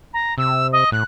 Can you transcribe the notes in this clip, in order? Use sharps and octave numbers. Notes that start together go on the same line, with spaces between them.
A#5
C3 E6
D#5
A2 F#6